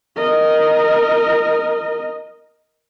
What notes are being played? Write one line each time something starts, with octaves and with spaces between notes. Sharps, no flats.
A#4 D#5